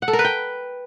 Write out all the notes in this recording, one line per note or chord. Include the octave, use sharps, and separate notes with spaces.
F#5
A4
A#4
B4
G5